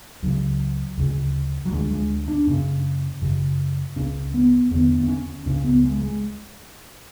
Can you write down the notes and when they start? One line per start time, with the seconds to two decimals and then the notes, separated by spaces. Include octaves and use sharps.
0.22 C#2 C#3 F#3
0.97 D2 C#3
1.66 F#3
1.72 D2 D3 G#3
1.91 G#3
2.28 D4
2.47 F#2 C#3 C#4
3.22 F#2 C#3
3.96 C#2 C#3 C#4
4.34 B3
4.71 E2 D3 B3
5.00 B3
5.08 C#4
5.46 C#2 C#3 C#4
5.64 B3
5.83 G#3
6.01 G#3